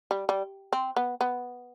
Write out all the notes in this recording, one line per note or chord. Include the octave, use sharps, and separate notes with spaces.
G3
G3
C4
B3
B3